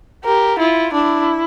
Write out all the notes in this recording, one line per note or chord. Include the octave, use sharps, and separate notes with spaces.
G4 A#4
E4 F4
D4 E4